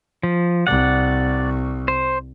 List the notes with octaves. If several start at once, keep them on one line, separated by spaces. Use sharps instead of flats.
F3
C2 D5 F#5
C5